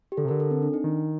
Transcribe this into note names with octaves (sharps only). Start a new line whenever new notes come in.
G4
D3 A4
C3
D3 A#4
A4
C4
D4
D#4
D#3